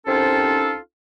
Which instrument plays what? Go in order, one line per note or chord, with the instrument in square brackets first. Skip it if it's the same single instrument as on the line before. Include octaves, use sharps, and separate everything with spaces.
[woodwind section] C2 C4 C#4 D#4 F4 A4